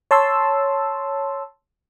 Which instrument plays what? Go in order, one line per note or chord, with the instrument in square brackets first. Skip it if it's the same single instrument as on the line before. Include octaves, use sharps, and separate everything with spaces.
[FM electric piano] C#5 A5 C6 E6